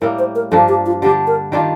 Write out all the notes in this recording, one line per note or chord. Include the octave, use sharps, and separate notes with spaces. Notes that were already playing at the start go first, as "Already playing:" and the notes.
A2 G3 A#3 A#4
C5
A#4
G2 F3 A#3 D4 A4
G4
F4
D3 G3 D4 G4
A#4
D#3 G3 D4 F4 D5